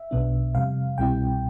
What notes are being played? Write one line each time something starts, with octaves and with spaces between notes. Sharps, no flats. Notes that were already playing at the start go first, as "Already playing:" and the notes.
Already playing: E5
B1 B2 B3 D4
F2 C3 G3 F5
C2 B2 G3 C4 E4 G5